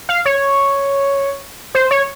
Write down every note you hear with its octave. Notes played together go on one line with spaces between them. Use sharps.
F5
C#5
C5
C#5